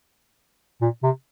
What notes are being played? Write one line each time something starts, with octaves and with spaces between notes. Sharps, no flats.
A#2
C3